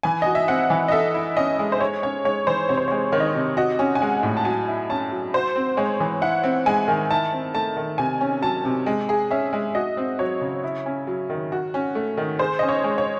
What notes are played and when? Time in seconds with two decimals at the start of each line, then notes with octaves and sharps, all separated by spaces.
0.03 E3 G#5
0.22 F#4 D#5
0.35 E5
0.48 C4 F#5
0.70 E3
0.88 D#5
0.92 A4 E5
1.14 E4
1.37 C#4 D#5
1.59 G#3
1.72 C5
1.81 G#4 C#5
2.02 C#4 C#5
2.24 G#3 C#5
2.47 E3 C5
2.69 C3 C#5
2.77 C5
2.88 G#3 C#5
3.12 D#3 C#5
3.20 D#5
3.27 C#5
3.35 C3
3.57 F#4 D#5
3.79 C#4
3.95 G#5
4.02 G#3 F#5
4.23 A2
4.37 A5
4.45 F#3 G#5
4.68 E4
4.90 C#4 A5
5.11 F#3
5.34 F#4 C5
5.56 C4
5.77 G#3 C#5
6.00 E3
6.22 E4 F#5
6.43 C4
6.66 G#3 G#5
6.88 D#3
7.11 E4 A5
7.33 C4
7.54 A3 A5
7.77 D#3
7.98 C3 G#5
8.21 C#4
8.42 F#3 A5
8.65 C3
8.86 G#3
9.09 G#4
9.31 C#4 E5
9.53 G#3
9.75 F#4 D#5
9.97 C4
10.19 F#3 C#5
10.41 C#3
10.64 E4
10.86 C#4
11.07 F#3
11.30 D#3
11.52 F#4
11.74 C#4
11.95 A3
12.17 D#3
12.39 G#4 C5
12.59 C#4 D#5
12.69 C#5
12.84 G#3
12.98 C#5